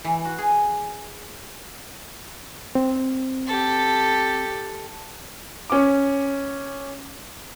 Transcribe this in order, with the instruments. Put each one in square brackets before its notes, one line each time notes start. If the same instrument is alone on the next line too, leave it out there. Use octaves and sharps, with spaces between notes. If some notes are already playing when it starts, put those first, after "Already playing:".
[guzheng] E3
F#4
G#4
[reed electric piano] C4
[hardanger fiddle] G4 A4
[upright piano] C#4 D6